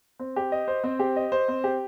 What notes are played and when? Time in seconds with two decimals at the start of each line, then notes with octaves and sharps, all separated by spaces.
0.19 C4
0.36 G4
0.52 D#5
0.68 C5
0.84 C4
0.99 G4
1.16 D#5
1.32 C5
1.48 C4
1.64 G4